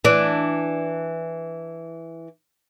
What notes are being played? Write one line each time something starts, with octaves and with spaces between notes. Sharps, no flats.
E3 D4